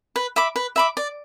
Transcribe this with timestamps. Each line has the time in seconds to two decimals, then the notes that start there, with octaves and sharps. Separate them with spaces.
0.16 B4
0.36 E5 B5 D6
0.56 B4
0.76 E5 B5 D6
0.97 D5